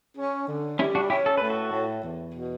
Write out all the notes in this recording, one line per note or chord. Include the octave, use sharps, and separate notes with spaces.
C#4
D3
G3 C#4 E4
D4 F#4
C#4 E4 G4
A4
A2 B4
F#4 A4
A2
E2
B2